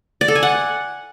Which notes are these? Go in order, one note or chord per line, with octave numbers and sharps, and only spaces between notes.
D5
A4
G#5
F#5